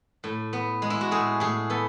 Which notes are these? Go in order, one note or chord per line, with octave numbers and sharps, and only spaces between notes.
A2
B3
G#3
E4
F#4
A2 G#4
A2 G#4
B3 A4